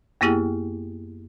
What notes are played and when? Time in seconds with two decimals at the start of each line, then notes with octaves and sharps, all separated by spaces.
0.21 F#2 A#3 B3 E4 G4 G#4